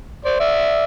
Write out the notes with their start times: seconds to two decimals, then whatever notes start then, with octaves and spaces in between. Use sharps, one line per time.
0.25 C5 D5
0.40 D5 E5